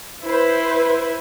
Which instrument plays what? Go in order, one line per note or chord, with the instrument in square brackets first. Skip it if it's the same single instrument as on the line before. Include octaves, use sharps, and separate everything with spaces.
[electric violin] E4 [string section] B4 C5